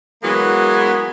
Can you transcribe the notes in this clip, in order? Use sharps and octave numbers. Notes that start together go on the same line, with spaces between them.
E3 F#3 G#3 A#3 B3